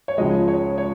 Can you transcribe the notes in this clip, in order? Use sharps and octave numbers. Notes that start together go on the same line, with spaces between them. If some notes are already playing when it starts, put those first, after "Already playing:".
C#5
C#2 C#3 F3 G#3 D#5
C#5
C#5